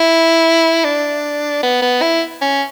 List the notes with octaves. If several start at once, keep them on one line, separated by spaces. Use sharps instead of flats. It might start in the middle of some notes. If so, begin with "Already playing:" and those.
Already playing: E4
D4
B3
B3
E4
C#4